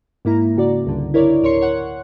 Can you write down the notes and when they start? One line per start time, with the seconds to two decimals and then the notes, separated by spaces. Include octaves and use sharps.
0.25 G#2 A#3 E4 A#5
0.57 C#3 F#4 D5
0.86 C#2 G2 D3
1.14 E4 A#4 C#5 D5
1.42 A1 D2 A#4 C#5 C6 C#7
1.61 C#5 F#5 F#6